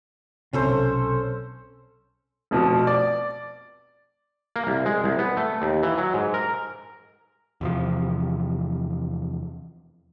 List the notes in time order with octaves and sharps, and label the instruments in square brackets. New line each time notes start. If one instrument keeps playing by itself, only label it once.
[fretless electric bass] B1 C3 [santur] C#4 A4 C5
[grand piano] F1 B2 F3
D5
[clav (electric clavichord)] A#3
C2
G#3
C2
B3
A3
D#2
E3
F#3
G#2
A#4
[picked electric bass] E2 C3 F3